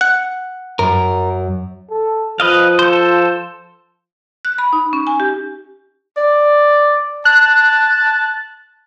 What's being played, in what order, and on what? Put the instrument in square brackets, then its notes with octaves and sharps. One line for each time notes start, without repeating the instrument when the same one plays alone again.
[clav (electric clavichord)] F#5
[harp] F#2 [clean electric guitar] A#4
[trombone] A4
[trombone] F3 [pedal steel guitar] B4 D#5 F5
[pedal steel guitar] A4 C5
[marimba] F#6
B5
D#4
C#4
G#5
G4
[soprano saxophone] D5
[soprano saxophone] A5 [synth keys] F#6